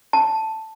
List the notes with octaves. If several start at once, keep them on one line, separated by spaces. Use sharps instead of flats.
A5